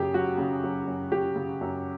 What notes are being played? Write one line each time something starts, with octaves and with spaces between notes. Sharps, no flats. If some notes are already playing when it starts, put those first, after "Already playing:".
Already playing: F#2 C#3 G4 G#4
F#3 F#4
C#3
F#3
F#2
C#3 G4
C#3
F#2